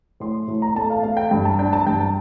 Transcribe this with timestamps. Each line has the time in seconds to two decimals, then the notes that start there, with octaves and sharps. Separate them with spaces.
0.20 A2 C6
0.48 A2
0.62 A#5
0.75 A3 A5
0.90 F5
1.03 A3 F5
1.17 G5
1.31 G2 G5
1.45 A5
1.59 D4 G5
1.73 A5
1.87 G2 G5
2.01 A5